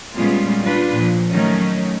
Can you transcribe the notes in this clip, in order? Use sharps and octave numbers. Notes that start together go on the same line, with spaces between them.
A#2 G3 G#3 B3 C#4 F4
G3 D4 F4 B4
A#2 F3
D#3 F#3 A3 C#4 D#4